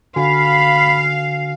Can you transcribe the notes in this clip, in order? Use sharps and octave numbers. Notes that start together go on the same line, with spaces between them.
D3 F#4 F5 G#5 B5